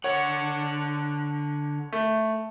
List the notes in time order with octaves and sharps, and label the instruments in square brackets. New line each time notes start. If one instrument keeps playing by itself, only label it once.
[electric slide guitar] D3 F#5 [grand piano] C#5
[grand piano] A3